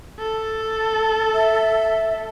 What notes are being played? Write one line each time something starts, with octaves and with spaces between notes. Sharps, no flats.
A4
E5